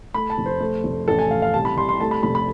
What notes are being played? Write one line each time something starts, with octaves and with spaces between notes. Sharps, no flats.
A3 B5
A5
F1
C5
A3
F1
A1 A4
G#5
A1 F5
F5
C2 A5
B5
C2 C6
C6
A3 A5
B5
F1 B5
B5